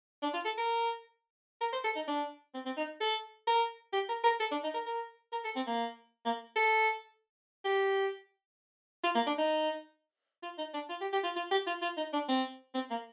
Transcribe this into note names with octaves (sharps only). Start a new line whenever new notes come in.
D4
F4
A4
A#4
A#4
C5
A4
D#4
D4
C4
C4
D#4
A4
A#4
G4
A#4
A#4
A4
D4
D#4
A#4
A#4
A#4
A4
C4
A#3
A#3
A4
G4
F4
A#3
D4
D#4
F4
D#4
D4
F4
G4
G4
F4
F4
G4
F4
F4
D#4
D4
C4
C4
A#3